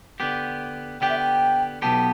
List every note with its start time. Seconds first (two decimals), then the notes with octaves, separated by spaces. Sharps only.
0.20 D3 B3 G4
1.01 D3 B3 G4 G5
1.09 E5
1.18 G5
1.82 B1 B2 B3 G4 A5